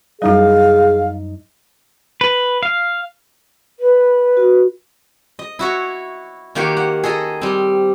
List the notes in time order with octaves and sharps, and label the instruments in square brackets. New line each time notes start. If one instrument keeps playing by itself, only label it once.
[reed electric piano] F#2 D#4 D#5 [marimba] G3 E4 [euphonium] G#4 [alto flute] F5
[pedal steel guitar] B4
F5
[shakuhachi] B4
[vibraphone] F#4
[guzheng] D#5
E4 F#4 C#5
D#3 A#3 G4 C#5 F#5
F#5
G#4 A4 D#5 A#5
G3 C4